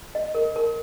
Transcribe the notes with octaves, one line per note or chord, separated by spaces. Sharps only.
D#5
A#4
A#4